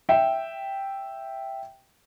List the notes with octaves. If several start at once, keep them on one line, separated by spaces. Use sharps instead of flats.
E5 G5